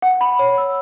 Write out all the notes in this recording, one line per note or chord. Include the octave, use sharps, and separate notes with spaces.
F#5
B5
C#5
E6